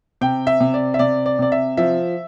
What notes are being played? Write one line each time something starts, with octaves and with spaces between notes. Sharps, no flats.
C3 G5
E5
C3
D5
E5
C3 D5
D5
C3 D5
E5
F3 E5